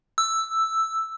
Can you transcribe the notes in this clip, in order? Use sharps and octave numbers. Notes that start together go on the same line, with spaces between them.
E6